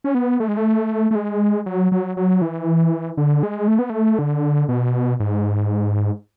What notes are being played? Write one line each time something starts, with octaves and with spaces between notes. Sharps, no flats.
C#4
B3
A3
G#3
A3
A3
G#3
F#3
F#3
F#3
E3
D3
G#3
A3
B3
A3
D3
B2
G#2